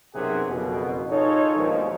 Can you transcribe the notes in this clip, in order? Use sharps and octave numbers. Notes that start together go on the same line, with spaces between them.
B1 F#2 C3 G#4 F#5
F#1 F2 B2
D#4 F4 G#4 A4 C#5
A#1 D#2 G#2 B2 D#3 F3